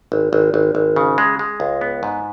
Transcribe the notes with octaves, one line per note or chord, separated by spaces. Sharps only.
G#1
G#1
G#1
G#1
C#3
G#3
G#3
C#2
B3
G#2